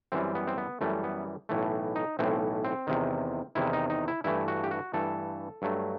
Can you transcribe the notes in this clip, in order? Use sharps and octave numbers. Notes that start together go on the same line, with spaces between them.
F#2 E3 G3 C4
B3
C4
B3
F#2 E3 G3 A3
B3
B1 A2 E3 A3
D#4
B1 A2 E3 A3 C4
C4
E2 C3 D#3
E2 C3 D#3 E4
D#4
D#4
E4
G2 E3 A3 E4
F#4
G4
F#4
G2 E3 A3 A4
G2 F#3 A3